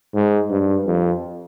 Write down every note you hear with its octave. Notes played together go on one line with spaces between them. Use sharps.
G#2
G2
F2